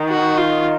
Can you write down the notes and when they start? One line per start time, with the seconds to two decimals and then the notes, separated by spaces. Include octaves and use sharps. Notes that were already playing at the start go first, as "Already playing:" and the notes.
Already playing: D#3
0.08 F#4
0.38 F4